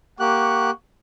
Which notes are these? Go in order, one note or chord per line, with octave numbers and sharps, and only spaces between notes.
A#3 G4 F#5 C#6 F#6